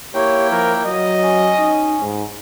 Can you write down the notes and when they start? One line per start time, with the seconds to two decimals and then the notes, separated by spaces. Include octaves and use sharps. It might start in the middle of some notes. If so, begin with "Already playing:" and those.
0.14 A#3 E4 G4 C#5 G5
0.50 F3 A#4
0.85 F#3 D#5
1.22 C#4
1.59 D#4
2.00 G#2